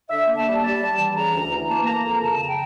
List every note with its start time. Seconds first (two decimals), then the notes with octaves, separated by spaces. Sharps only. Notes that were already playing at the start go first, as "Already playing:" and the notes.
0.10 D3 E5
0.27 A#3
0.36 A5
0.46 G3
0.63 G3 A5
0.81 G3
0.99 E3
1.16 C#3 A#5
1.33 D2
1.51 E3
1.69 A#3 A5
1.86 A#3 A#5
2.04 F2 A#5
2.22 C#3 A5
2.39 C#3
2.49 G5